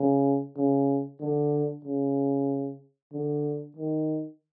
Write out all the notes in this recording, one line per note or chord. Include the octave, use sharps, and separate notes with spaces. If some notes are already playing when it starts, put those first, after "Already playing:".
Already playing: C#3
C#3
D3
C#3
D3
D#3